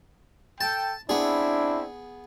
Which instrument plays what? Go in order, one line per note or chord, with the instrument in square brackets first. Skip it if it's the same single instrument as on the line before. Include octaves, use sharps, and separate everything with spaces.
[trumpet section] A4 G5 [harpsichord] A5
[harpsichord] B3 G#4 [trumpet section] C4 E4 [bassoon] D4